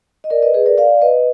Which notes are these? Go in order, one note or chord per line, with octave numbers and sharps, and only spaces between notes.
D#5
A#4 D5
B4 D#5
G#4 B4
A#4 D5
D5 F5
B4 D#5